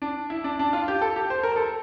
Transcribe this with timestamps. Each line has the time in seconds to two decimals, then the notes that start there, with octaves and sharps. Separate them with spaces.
0.02 D4
0.30 E4
0.44 D4
0.59 D4
0.73 F4
0.88 G4
1.02 A4
1.16 G4
1.30 C5
1.43 A#4
1.56 A4